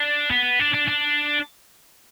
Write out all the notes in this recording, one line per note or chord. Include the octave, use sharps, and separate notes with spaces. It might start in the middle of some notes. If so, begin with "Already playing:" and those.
Already playing: D4
B3
D4
D4
D4